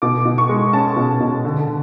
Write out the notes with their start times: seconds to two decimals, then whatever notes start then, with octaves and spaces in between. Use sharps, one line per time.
0.02 B2 D6
0.25 B2
0.38 C#6
0.49 G#3
0.73 C#4 A5
0.96 B2
1.20 B2
1.44 D3
1.67 D3